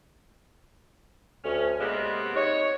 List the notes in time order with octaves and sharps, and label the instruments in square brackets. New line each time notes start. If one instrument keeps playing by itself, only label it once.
[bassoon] D2 [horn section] C#4
[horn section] C3 A#3 B3 [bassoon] G#3
[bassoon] D#4 [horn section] C#5